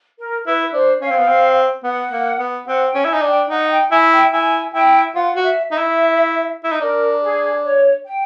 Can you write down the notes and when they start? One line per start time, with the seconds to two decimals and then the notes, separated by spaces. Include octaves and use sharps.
0.19 A#4
0.46 E4 B4
0.73 D4 C5
1.01 C#4 F5
1.11 C4
1.19 B3
1.27 C4
1.84 B3 F#5
2.12 A#3
2.39 B3
2.67 C4 F#5
2.87 G5
2.95 C#4
3.05 E4 G#5
3.13 D#4
3.22 D4
3.29 G5
3.50 D#4 F#5
3.71 G5
3.91 E4 G#5
4.12 G5
4.33 E4 G#5
4.74 E4 G5
5.15 F4 F#5
5.36 F#4
5.43 E5
5.71 D#4 E5
5.78 E4
6.64 E4
6.72 D#4
6.81 D4 A#4
7.23 G#4
7.64 C#5
8.06 G5